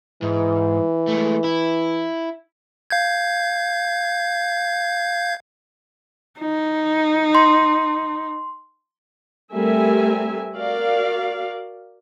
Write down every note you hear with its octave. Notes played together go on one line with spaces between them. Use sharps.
G#2 E3
G#3 A3
E4
F5 G6 G#6
D#4
C6
G3 A3 C4 A#4 E5 G#5
F#4 A#4 D5 F5